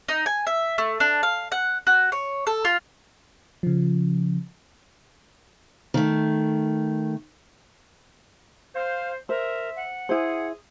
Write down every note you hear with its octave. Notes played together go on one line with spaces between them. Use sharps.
D#4
G#5
E5
A3
D4
F5
F#5
F#4
C#5
A4
F4
C#3 F3
D#3 A3
C5 F5
A#4 C5 E5
F#5
E4 G#4 C5